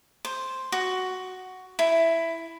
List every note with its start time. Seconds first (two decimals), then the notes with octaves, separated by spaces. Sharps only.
0.25 C5
0.72 F#4
1.79 E4